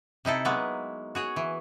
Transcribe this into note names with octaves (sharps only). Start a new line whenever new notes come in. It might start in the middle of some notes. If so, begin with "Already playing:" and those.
C3 D#4 E4 A4
F#3 G#3 A#3 B3
F#4 G#4 C#5
E3